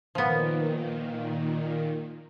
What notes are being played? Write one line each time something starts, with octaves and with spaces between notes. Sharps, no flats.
A#2 D#3 F3 B3